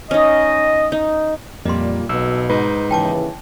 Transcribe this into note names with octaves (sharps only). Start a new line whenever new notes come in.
C#4 D#4 D#5
D#4
F2 A#2 G3 A#3 D#5 C6
B1 B2 E6
G#2 D#4 B4
D#2 C#3 E3 G5 A5 D6